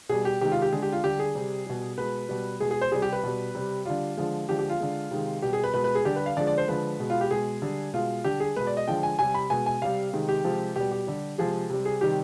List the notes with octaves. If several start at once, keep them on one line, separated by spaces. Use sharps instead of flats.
B2 G3 G#4
G4
C3 D#3 G#3 G4
F4
G4
D3 G#3 G#4
G4
F4
D3 G3 G4
G#4
C3 G3
B2 G3
B2 G#3 B4
B2 G3
B2 G#3 G#4
G#4
C5
C3 G3 G#4
G4
B4
B2 G3
C3 G3
D3 G3 F4
D3 F3 G#3
D3 F3 G#3 G4
G4
F4
D3 G#3
C3 D#3 G#3
B2 G3 G4
G#4
B4
B2 G#3 B4
B4
G#4
D3 G3 G4
B4
F5
D3 F3 G#3 D5
D5
C5
D3 F3 G#3 B4
B2 G#3
F4
G4
B2 G#3 G#4
D3 G3
B2 G#3 F4
D3 G3 G4
G#4
B2 G#3 B4
D5
D#5
D3 F3 G#3 G5
G#5
C3 G3 G#5
B5
B2 G#3 G#5
G#5
C3 G3 F5
C3 D#3 G#3
G4
C3 F3 G#3
B2 G3 G4
G4
D3 G3
C3 F3 G#3 G#4
C3 G3
G#4
C3 D#3 G3 G4